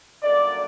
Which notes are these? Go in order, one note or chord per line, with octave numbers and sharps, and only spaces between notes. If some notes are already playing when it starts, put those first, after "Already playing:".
F#2 D3 G3 A#3 D5